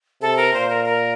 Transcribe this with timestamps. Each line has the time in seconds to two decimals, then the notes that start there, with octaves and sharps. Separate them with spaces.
0.21 C3 A4
0.37 A#4
0.53 A#2 C5
0.69 A#4
0.85 A#4